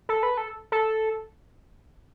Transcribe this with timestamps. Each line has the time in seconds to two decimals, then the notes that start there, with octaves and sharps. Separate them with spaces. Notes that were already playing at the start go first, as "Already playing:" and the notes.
0.09 A4
0.23 B4
0.37 A4
0.72 A4